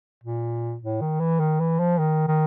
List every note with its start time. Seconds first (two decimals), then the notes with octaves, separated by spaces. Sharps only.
0.24 A#2
0.82 A2
1.01 D#3
1.20 E3
1.40 D#3
1.60 E3
1.80 F3
1.99 D#3
2.28 D#3